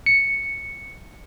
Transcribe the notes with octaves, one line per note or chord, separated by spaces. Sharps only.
C#7